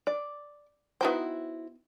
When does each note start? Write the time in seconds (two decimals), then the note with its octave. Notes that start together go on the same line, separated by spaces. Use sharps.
0.07 D5
1.01 B3 D#4 E4 F#4 C5 G5